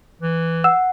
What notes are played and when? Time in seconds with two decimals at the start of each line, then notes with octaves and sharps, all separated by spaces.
0.22 E3
0.64 F#5 E6